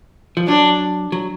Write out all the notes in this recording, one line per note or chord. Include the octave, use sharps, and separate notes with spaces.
F3
F#3 D4
F#3